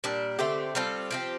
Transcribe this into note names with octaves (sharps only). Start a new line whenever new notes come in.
A#2 G3 D4
D3 A3 C4 G4
G3 C4 F4 A4
F3 C4 G4